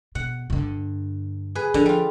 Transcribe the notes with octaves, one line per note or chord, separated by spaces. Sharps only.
B2 F#5
G2 D3
G#4 B4
D3 F3
G3 F4